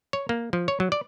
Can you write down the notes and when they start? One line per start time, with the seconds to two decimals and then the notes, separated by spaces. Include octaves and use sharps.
0.13 C#5
0.29 A#3
0.53 F3
0.68 C#5
0.80 F#3
0.92 D5